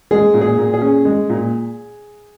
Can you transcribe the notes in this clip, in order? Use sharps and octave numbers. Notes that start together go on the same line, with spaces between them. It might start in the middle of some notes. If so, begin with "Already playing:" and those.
G#3 G#4
A#2
G#4
A#2
G#4
C#4
G#3
A#2